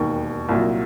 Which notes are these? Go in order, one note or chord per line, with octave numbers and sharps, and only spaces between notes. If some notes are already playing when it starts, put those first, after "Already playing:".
Already playing: E1 D#2 D#3
C2 A#2 F#3